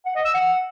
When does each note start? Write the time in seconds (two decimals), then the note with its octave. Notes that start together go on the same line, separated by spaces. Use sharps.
0.06 F#5
0.15 D#5
0.25 E6
0.34 F#5